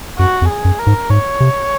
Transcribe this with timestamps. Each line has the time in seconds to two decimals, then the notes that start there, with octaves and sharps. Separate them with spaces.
0.19 F#2 F#4
0.42 F2
0.49 G#4
0.65 F#2
0.79 A#4
0.87 G#2
1.10 G#2 C#5
1.40 C3